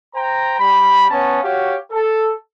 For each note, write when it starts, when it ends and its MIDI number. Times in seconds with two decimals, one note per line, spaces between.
0.14 0.56 72
0.14 0.56 79
0.14 0.56 82
0.58 1.03 55
0.58 1.03 83
1.10 1.41 59
1.10 1.41 61
1.10 1.41 73
1.10 1.41 81
1.42 1.74 66
1.42 1.74 67
1.42 1.74 73
1.42 1.74 77
1.91 2.33 69